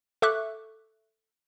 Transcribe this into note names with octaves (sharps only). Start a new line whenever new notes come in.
A4 E5 C#6 D6 F#6